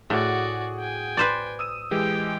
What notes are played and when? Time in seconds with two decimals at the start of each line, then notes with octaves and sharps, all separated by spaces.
0.10 A2 F#4 G#4 D5 F#5
0.79 G5 G#5
1.17 B4 C5 D5
1.59 D#6 E6 D#7
1.91 E3 G#3 G4 G5